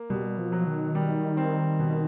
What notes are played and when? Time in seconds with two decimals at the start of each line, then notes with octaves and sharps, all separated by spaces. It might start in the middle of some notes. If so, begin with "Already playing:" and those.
Already playing: A#3
0.10 B2 G3
0.38 F3
0.52 F#3
0.67 D#3
0.95 G3
1.37 C4
1.79 B2